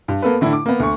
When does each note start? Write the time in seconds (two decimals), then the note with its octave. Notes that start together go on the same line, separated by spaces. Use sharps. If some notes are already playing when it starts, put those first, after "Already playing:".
0.08 G2
0.22 A#3 B3 A4 B4
0.41 A2 D3 E4
0.53 D6
0.66 A#3 B3
0.80 D2 C#6